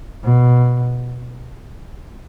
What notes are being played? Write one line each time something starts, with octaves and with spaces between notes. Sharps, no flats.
B2